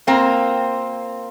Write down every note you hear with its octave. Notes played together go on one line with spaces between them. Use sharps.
A#3 C4 F4